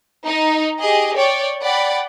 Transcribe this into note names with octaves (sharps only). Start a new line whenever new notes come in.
D#4
G4 G#4 D#5
C#5 D5 G5
D5 F#5 G5 B5